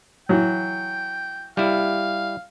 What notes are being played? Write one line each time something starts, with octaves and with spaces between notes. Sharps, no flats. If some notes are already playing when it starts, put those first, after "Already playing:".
E3 F#3 G5
G3 E4 F5